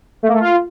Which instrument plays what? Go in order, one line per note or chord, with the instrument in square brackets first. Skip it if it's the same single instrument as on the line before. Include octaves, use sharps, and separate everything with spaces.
[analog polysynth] A3
A#3
A3
F4